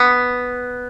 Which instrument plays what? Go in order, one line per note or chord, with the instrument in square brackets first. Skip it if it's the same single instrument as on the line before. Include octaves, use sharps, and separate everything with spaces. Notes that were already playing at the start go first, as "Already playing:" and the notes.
Already playing: [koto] B3